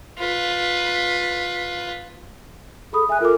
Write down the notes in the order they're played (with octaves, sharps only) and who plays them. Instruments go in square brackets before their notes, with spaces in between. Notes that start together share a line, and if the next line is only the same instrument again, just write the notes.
[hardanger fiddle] F4 B4
[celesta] G#4 B5 D#6 [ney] A4
[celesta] E5 F#6 [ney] G#5
[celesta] F4 A4 D6 [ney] A#4